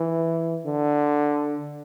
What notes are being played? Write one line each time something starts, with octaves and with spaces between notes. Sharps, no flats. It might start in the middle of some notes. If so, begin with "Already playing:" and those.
Already playing: E3
D3